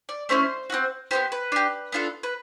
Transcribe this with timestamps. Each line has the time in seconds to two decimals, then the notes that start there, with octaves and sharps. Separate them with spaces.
0.09 D5
0.29 A3 C#4 E4 C5
0.70 C4 D#4 F#4
1.11 B3 D#4 G4 C5
1.32 B4
1.52 D4 G4
1.92 B3 D4 F4 A4
2.23 B4